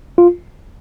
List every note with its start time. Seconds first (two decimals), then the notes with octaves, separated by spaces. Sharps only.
0.18 F4